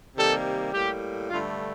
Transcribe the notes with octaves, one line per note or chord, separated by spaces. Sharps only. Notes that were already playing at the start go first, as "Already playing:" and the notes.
C3 D#3 G3 A#3 A4
A2 G3 A#3 G4
G2 D3 A3 F4